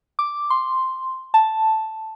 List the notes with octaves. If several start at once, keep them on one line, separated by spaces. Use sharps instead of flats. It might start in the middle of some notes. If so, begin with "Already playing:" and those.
D6
C6
A5